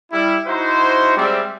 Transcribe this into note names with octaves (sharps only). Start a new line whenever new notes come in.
G3 E4
D#4 E4 F#4 C5
G3 G#3 C4 D5 E5